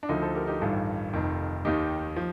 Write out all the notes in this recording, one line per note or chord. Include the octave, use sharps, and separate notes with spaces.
D4
D2 D3 F3 D#4
A4 C5
G4 A#4
D#4 G4
A1 G2 D#3 F4 A4
F1 F2 D#3
D#2 D#3 D#4 G4
F3